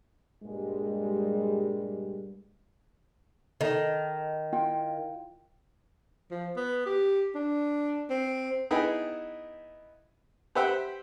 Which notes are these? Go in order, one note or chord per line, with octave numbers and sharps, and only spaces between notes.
G2 A#2 G3 G#3
D#3 A4 D#5
E4 F4 G5
F3
B3
G4
D4
C4
B3 D#4 E4 G#4 G5 B5
G4 B4 C5 E5 F#5 G5